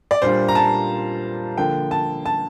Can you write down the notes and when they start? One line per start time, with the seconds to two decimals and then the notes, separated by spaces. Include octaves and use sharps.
0.11 D5
0.22 A#2 G3 D4 F4 C5
0.48 A#5
0.55 A5
1.58 D3 F3 A#3 G5
1.91 A5
2.26 A5